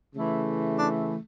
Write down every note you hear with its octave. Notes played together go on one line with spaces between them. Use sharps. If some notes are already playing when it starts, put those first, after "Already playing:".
C#3 E3 A3
D4